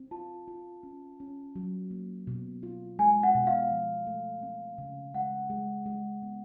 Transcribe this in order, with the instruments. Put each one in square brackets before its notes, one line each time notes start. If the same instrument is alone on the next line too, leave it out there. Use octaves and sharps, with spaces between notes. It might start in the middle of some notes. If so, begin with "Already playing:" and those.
Already playing: [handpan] C4
[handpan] F4 [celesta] A5
[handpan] F4
C#4
C#4
F#3
A#3
B2
F4
[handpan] G#3 [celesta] G#5
[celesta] F#5
[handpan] B2
[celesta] F5
[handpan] F3
A3
C4
C#3
[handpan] G#3 [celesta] F#5
[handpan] G#3
G#3
B3